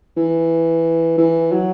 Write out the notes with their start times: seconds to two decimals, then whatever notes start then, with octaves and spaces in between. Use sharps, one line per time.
0.17 E3
1.18 E3
1.52 F#3